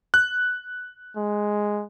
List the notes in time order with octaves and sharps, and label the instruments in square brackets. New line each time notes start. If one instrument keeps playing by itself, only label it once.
[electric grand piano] F#6
[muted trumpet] G#3